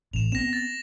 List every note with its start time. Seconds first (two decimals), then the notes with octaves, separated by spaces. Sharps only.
0.13 A1 A2 E7 F7
0.32 B3 C4 A#6 E7
0.53 A6